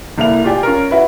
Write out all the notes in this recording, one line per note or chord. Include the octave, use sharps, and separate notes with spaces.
C2 A#3 E4 A4 F7
F4 G4 D5 G5 G#5
C#4 F4 A#4
E4 F#4 B4